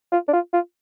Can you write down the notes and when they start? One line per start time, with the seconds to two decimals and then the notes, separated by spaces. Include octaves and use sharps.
0.12 F4
0.28 D4
0.33 F4
0.53 F4